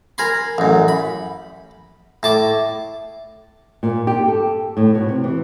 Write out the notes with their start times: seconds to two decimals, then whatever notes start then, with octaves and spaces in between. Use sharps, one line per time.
0.18 A#4 G#5 B5 C6
0.58 A1 F#2
0.88 B5
2.23 A2 A5 D6
3.83 A#2
4.07 G4
4.28 A4
4.77 A2
4.95 B2
5.09 C3
5.24 E3